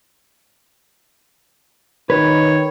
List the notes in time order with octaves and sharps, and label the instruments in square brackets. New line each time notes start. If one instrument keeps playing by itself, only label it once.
[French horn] D#3 [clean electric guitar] B4 [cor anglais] C#5